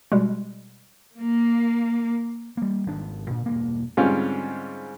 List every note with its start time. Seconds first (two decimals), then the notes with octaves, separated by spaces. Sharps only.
0.12 B2 G3 G#3
1.18 A#3
2.57 G3 A#3
2.86 G#1 D#3 D4
3.30 A#2
3.46 E1 G2 A#3
3.97 G#2 D3 G3 C4 C#4 F4